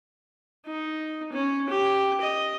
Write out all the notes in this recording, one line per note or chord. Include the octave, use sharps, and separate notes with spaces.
D#4
C#4
G4
D#5